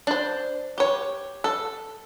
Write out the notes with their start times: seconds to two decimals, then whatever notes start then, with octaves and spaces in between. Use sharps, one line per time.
0.07 D4 C5
0.78 G4 C#5
1.44 A4